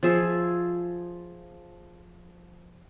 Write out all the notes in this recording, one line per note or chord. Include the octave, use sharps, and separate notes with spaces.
F3 G#4 E5